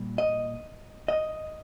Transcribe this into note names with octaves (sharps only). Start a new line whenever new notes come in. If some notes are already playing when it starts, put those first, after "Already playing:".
Already playing: A#2 G3
D#5
D#5